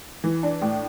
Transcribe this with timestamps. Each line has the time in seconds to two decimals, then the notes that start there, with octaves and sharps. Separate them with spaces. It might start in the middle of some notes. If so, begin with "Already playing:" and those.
0.24 E3
0.43 D4
0.62 A2